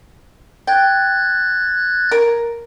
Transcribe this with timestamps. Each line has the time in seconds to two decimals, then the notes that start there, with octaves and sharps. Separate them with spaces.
0.67 G5 F#6 G#6 A6
2.11 A#4